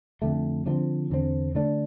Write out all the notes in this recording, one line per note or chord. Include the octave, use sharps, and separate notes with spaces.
F2 D3 A3
D3 F3 A3 C4
E2 D3 A3 C4
D3 A3 D4